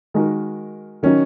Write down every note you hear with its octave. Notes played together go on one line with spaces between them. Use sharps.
D#3 G#3 D#4 F#4 A#4
D#3 F#3 C#4 D#4